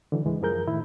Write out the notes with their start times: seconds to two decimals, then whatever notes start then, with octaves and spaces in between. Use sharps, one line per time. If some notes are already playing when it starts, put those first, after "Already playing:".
0.12 D3 E3 F#3
0.25 C#2 G#2 E3 G#3
0.41 F#2 F3 G#4 A#4 G6
0.67 A2 D#3 E4